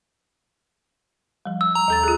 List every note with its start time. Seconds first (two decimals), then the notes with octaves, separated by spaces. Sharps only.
1.46 F3 G3
1.61 E6
1.75 A#5
1.88 D#2 A4 A6
2.03 F4 G#4